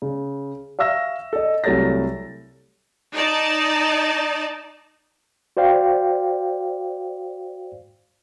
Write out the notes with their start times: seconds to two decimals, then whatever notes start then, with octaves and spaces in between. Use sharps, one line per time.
0.02 C#3
0.79 E5 F5 C#6 E6 A#6
1.33 A4 D#5
1.64 C2 F#3 A3 C#5 A6 A#6
3.15 D#4 D5 A5
5.57 F#4 C5 D5 F5 G5